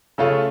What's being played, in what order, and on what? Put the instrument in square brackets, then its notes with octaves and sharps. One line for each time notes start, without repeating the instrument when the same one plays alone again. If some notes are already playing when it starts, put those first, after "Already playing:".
[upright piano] C#3 A3 C#4 F4